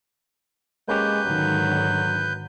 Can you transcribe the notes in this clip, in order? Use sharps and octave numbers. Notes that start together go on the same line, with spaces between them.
G#3 A#3 C#4 G4 B4 G6
G#2 D3 D#3 F#3